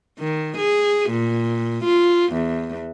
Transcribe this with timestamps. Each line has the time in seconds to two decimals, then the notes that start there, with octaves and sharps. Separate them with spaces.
0.19 D#3
0.58 G#4
1.10 A#2
1.85 F4
2.33 E2